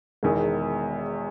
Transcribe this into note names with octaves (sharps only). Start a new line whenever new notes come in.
E1 E2 D#3